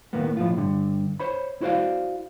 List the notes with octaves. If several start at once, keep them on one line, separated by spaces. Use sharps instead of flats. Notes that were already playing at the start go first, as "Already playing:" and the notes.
D#2 A2 A#3 B3
A2 F3 F4
G2 D3
C5 C#5 B5
E4 F#4 C5 D5 F5